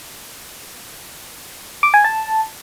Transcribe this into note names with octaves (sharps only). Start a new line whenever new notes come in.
D6
G#5
A5